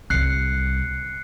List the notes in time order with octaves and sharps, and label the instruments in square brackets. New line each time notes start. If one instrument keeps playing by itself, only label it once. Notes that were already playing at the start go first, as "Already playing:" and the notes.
[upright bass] C2 G3 [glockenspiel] F#6 C7 C#7